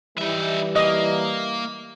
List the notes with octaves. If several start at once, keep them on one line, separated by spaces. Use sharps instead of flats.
E3 G3 D#4 E5
A#3 D#5